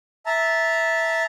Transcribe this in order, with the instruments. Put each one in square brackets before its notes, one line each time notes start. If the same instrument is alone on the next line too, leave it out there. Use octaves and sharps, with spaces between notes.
[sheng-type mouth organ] E5 A5 A#5